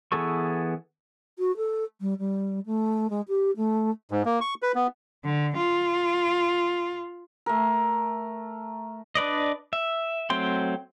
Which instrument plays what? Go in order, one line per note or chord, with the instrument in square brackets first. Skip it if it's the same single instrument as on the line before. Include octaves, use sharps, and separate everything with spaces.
[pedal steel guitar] E3 B3 G#4 A4 C#6
[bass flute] F#4
A4
G3
G3
A3
G#3
G4
A3
[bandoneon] G#2
A#3
C#6
B4
B3
[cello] D3
F4
[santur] A3 A#4
[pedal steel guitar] D4 B4 D5 D#5
E5
F#3 A3 C4 G5 C6